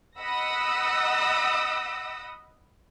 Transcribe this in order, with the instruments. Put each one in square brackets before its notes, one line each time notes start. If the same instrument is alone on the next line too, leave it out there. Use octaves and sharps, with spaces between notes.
[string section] D#5 F#5 B5 D#6 E6 A#6